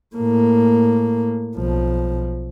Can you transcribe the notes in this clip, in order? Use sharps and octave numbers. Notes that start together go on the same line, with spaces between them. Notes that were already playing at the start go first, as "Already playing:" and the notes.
A2 A#3
B1 F3